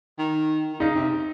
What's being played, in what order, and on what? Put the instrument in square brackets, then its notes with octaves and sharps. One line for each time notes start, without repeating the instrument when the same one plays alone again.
[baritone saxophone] D#3
D#3
[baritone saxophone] C#3 [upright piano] D#4
[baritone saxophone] C3